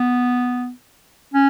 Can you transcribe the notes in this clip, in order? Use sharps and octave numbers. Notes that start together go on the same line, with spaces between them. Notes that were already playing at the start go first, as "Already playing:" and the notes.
Already playing: B3
C#4